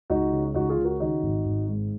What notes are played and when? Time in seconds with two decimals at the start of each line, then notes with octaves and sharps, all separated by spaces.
0.10 C#2 D#4 F#4
0.32 C#3
0.54 C#2 D#4 F#4
0.70 F4 G#4
0.77 C#3
0.84 F#4 A#4
1.00 D#3 D#4 F#4
1.23 G#1
1.45 G#1
1.68 G#2